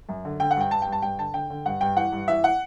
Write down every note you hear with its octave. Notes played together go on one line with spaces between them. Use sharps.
F#2
D3
D3 G5
F#5
G2 G5
G2 A5
G5
G2
A5
G2 G5
D3 A5
D3 G5
D3
G2 F#5
G2 G5
E3 F#5
G2
E3 E5
F#5